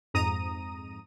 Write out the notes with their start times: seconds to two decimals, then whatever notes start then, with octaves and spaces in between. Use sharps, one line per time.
0.14 F2 G#2 A#5 D#6 D#7